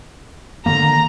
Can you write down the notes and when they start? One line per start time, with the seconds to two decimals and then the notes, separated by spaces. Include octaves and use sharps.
0.66 D3 D#3 A#3 A#5